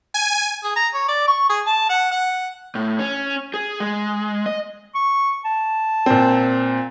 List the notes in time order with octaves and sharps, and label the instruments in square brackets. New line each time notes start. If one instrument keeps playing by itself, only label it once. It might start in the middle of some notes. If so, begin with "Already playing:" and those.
[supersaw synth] G#5
[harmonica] G#4
A#5
C#5
D5
C#6
G#4
A5
F#5
F#5
[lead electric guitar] A2
C#4
G#4
G#3
D#5
[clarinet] C#6
A5
[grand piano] A#2 C4